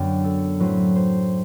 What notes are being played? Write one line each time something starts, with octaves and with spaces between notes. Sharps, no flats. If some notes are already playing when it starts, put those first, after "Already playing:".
Already playing: F#2 D3 F#3 B3 D4 G5
A4
A2 F#3 A3 C4 B4
C5